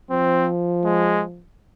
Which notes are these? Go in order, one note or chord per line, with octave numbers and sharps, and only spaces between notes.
F3 C4
G#3